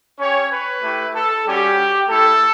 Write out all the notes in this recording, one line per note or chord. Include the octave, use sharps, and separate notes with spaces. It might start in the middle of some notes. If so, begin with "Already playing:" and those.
C#4 G4 C#5
B4
A3 E4 G4
A4
G3 C#4 F#4 G4
A3 E4 G4 A4